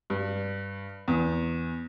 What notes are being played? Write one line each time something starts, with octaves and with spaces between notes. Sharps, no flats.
G2
E2